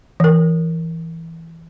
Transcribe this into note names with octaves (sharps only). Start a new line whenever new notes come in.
E3 A#4